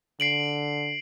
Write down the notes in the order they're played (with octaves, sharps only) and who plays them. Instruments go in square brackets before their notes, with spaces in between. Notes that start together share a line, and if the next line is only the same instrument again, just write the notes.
[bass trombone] D3 [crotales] C7 D7 F#7